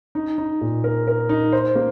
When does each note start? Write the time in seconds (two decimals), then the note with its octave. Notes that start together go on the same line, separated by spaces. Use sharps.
0.15 D#4
0.38 D#4
0.61 A#2
0.84 A#4
1.07 A#4
1.29 D#4
1.52 C5
1.75 A#3